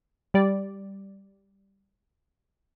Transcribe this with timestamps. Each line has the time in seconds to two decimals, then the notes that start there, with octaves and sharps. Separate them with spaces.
0.34 G3 D5